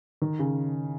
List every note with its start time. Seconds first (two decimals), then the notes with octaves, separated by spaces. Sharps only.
0.22 D#3
0.39 C#3